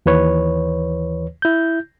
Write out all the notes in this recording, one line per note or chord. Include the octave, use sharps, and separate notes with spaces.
D#2 E3 B4 C#5
E4 G6